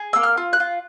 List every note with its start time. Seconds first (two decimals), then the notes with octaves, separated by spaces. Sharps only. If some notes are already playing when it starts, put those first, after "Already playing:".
Already playing: G#4
0.13 A#3 E6
0.23 F6
0.37 F4
0.53 F#6
0.60 F4